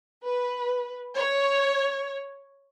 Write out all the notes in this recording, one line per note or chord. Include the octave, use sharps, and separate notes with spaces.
B4
C#5